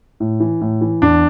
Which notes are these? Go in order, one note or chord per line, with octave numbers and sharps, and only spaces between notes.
A2
E3
A2
E3
E2 D4